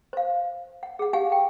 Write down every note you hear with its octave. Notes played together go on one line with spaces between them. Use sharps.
C5 F5
F#5
G#4 F#5
G4 F5 F#5 G#5
G5